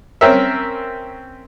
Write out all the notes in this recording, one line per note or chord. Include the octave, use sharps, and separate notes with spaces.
C4 C#4 A#4 E5